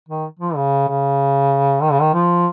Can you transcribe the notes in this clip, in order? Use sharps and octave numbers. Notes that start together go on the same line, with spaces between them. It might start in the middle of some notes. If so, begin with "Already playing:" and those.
D#3
F3
C#3
C#3
D#3
C#3
D#3
F3